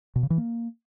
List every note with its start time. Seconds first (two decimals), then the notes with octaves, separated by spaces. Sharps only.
0.16 B2
0.23 C#3
0.30 E3
0.38 A#3